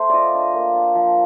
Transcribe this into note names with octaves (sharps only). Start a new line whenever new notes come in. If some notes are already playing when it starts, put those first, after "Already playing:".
Already playing: A3 C5
F4 D5 D#5
D4
A#3
D4
F3